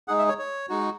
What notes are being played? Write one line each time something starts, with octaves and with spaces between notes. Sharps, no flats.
G#3 D#4 G#4 F#5
E5
C#5
C#5
G#3 D#4 F#4